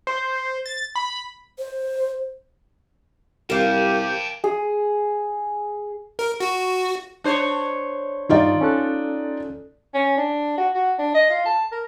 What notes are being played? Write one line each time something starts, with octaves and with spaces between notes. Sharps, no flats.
C5
A6
B5
C5
C2 G4 A#4 F5 G5 A5
G#4
A#4
F#4
D4 C5 C#5
G2 D#3 D#4 F4 D5
C#4 A4 F#6
C#4
D4
F#4
F#4
D4
D#5
F4
A5
A#4